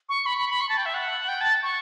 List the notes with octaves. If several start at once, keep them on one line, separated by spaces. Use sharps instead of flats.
C#6
B5
B5
B5
C#6
A5
G5
E5
F#5
G5
A5
C#6